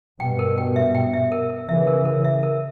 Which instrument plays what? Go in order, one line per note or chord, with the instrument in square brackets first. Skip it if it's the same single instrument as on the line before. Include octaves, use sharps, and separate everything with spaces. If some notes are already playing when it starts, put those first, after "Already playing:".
[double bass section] G2 B2 [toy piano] G5
[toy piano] A#4
G5
E5
G5
E5
A#4
A#4
[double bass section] C#3 E3 [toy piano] E5
[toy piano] A#4
A#4
E5
A#4